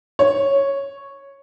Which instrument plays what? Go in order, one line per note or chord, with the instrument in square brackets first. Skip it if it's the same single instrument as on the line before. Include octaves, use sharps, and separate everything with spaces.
[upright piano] C#5